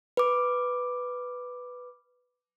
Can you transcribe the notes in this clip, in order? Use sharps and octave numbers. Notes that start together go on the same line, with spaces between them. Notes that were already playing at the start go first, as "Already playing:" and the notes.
B4 D6